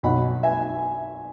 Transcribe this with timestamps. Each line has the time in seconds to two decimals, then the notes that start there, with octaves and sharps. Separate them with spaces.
0.03 B1 B2 F#3 F#5 B5
0.43 E5 G#5